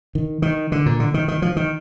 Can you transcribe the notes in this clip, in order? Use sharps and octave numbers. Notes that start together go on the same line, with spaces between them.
D#3
D#3
D3
A#2
D3
D#3
D#3
F3
D#3